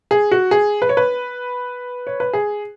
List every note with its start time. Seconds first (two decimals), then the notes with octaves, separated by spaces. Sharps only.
0.11 G#4
0.31 F#4
0.51 G#4
0.82 B4
0.89 C#5
0.97 B4
2.07 C#5
2.20 B4
2.33 G#4